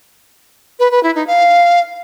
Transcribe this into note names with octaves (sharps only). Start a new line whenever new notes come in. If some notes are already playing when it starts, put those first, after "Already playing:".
B4
B4
E4
D#4
F5